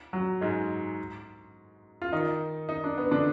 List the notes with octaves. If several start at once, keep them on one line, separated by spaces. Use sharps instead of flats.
F#3
G#2 G#3
F4
D#3 D#4
D#4
D4
B3
D3 D4